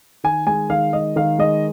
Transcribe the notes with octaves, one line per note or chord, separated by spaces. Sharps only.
D#3 G#5
G#3 G#5
D#3 F5
G#3 D#5
D#3 F5
G#3 D#5